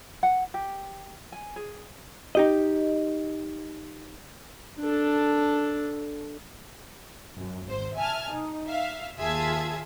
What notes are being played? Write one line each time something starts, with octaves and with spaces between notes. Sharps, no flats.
F#5
G4
G#5
G#4
D#4 G4 D#5
D4 A4
F#2
G#1 C5
E5 G#5 A5 F6
D#4
E5 F5
D#2 F4 G#4 E5 A5 G#6